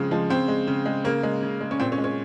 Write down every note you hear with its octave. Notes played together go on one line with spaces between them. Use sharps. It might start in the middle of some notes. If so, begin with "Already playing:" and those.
Already playing: C#3 F3 G#3 C4
F3 G#3
C#3 C4
G#3
C#3
G#3
C#3 A#3
G#3
C#3
G#3
C#4
A#2 C4
C#4
G#3
C#4